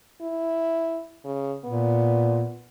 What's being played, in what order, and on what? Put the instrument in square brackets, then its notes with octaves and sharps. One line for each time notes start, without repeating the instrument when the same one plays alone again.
[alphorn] E4
C#3
[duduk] A#2 [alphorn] B3